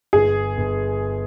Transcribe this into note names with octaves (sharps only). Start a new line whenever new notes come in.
G1 G#4
G1